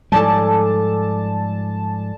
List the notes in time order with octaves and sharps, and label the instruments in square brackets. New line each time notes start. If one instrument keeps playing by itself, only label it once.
[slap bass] G#2 F3 G3 [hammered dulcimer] A4 D5 G#5 [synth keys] A5